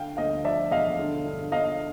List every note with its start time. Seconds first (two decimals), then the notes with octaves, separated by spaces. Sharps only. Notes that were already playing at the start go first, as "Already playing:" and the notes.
Already playing: D3 F5 G5
0.17 D2 D#5 F5
0.44 F3 D5 E5
0.71 E1 D#5 F5
0.99 D3
1.26 G2
1.52 G1 D#5 F5